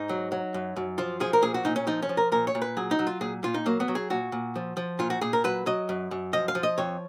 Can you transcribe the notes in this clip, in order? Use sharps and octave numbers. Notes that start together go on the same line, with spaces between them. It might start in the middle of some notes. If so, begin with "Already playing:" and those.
Already playing: G#2 D#4
F#3
F#3
F#2
F#2
F3 F4
F3 G#4
A#4
A#2 G#4
F#4
A#2 D#4
C#4
F3 D#4
C#4
F3
A#4
A#2 A#4
C#5
A#2
B4
F#3 G#4
D#4
F#3
F4
A#2 G#4
A#2 F4
D#4
F#3 A#3
B3
F#3
G#4
A#2 F#4
A#2
F3
F3
A#2 F4
F#4
A#2 G#4
A#4
F#3 B4
F#3 D#5
F#2
F#2
F3 D#5
F5
F3
D#5
F2 C#5